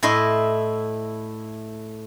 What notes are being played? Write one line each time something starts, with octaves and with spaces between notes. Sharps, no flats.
A2 E4 D#5 C6